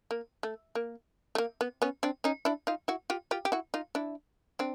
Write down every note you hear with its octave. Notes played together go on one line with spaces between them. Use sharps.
A#3
A3
A#3
A3
A#3
B3
B3 C#4
C4 D4
C#4 D#4
D4 E4
D#4 F4
E4 F#4
F4 G4
F4 G4
G4
E4 F#4
D#4 F4
D4 E4
C4 D4